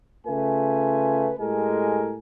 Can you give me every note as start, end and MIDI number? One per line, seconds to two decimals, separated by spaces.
0.27 1.31 49
0.27 1.31 57
0.27 1.31 65
0.27 1.31 71
0.27 1.31 80
1.38 2.16 45
1.38 2.16 56
1.38 2.16 67
1.38 2.16 69
1.38 2.16 70
1.38 2.16 80